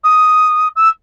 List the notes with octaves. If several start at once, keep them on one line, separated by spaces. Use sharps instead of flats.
D#6
E6